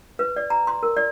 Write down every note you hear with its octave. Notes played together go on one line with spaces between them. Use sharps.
B4
D5
A#5
C6
A#4
D5